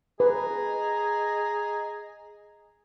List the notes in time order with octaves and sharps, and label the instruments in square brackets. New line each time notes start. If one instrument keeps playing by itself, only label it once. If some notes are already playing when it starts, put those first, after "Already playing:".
[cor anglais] G#4 [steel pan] B4 [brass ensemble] D#5 A#5